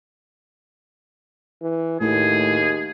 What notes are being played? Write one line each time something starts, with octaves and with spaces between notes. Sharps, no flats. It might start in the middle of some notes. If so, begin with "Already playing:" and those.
E3
D#2 A2 G#4